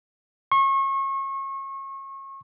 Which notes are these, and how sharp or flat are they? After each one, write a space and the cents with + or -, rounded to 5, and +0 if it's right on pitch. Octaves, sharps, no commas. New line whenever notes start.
C#6 -35